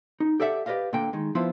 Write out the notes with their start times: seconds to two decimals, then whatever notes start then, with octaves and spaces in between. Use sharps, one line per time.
0.20 D#4
0.40 G4 A4 D5 E5 F#5
0.66 G4 B4 D5 D#5 F5
0.93 A#2 D3 A#3 G5
1.13 D#3 G#3
1.35 F3 B3 E4 F4 C5